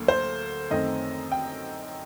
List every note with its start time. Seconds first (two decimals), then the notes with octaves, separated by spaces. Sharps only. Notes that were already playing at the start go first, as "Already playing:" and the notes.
Already playing: D2 D3 F#3 A#3
0.08 C5
0.70 F#2 D#3 A3 C4 D#5
1.32 G5